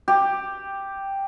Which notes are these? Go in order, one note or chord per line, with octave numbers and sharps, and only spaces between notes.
G4